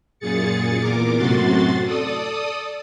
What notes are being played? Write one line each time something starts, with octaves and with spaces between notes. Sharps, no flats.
F#2 A#2 G#4 A6 C#7
E2 A#2 A#4 D6
F#2 A2 C3 F#4 C6 A6
A4 D5 D#6